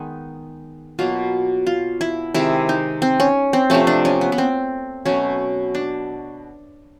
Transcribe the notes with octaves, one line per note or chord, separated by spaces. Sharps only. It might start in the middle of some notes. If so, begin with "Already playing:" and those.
Already playing: D#3 G#3 B3 D#4
B2 F#3 A#3 F4
F4
E4
C3 D#3 G#3 E4
D#4
C4
C#4
C4
C3 F3 A3 C#4
D4
C#4
B3
B3
C4
B2 F#3 A3 C#4
D4